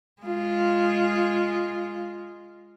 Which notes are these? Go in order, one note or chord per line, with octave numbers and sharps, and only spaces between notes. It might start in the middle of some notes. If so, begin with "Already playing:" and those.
G#3 F4